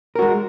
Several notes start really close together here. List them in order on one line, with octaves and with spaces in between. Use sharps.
A#4 F#4 G#3